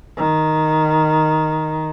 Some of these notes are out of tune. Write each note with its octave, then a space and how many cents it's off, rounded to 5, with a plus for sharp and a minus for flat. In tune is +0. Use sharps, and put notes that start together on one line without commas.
D#3 +0